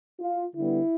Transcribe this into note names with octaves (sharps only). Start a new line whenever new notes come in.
F4
D3 G3 B3 E4